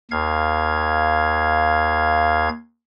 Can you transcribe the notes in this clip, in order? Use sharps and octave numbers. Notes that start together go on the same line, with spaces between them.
D#2 F5 G#6